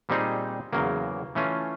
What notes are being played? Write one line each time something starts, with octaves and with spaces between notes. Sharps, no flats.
A#2 G3 C4 D#4 G#4
E2 C#3 F#3 A#3
E3 A3 C#4 F4